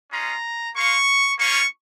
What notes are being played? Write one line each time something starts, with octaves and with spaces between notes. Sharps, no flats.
G#3 C#4 F4 A#5
A#3 F4 C#6
A#3 C#4 F4 C#6